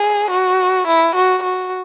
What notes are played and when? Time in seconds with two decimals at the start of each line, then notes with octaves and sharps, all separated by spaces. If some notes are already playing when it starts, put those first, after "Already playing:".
Already playing: G#4
0.31 F#4
0.87 E4
1.15 F#4
1.43 F#4